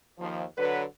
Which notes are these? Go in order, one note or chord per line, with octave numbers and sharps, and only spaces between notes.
D#2 F3
D3 F#3 B4